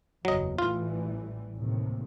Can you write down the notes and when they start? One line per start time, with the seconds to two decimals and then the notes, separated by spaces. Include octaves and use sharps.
0.25 F#1 E2 F#3 D#5
0.59 A1 E3 G3 F4
1.55 D#2 A2 C3